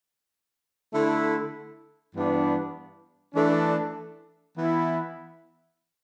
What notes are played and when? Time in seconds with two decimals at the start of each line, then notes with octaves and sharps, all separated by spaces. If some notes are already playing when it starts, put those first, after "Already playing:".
0.93 D3 A3 E4
2.14 G2 E3 B3 D4
3.34 E3 A3 D4
4.55 E3 B3 E4